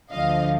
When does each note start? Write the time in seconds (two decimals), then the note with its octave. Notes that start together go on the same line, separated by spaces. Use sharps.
0.12 D2 D3 F3 D#5 F5